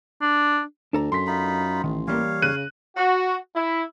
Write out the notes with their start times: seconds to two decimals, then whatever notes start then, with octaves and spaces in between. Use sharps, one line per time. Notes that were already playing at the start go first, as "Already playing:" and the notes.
0.21 D4
0.93 D2 D4 A4 A#5
1.12 F#2 C6 B6
1.27 D#4 F4 B5
1.84 A1 D#3
2.07 E3 G3 A#3 C#5 F5
2.42 C#3 F#6 D#7
2.97 F#4
3.56 E4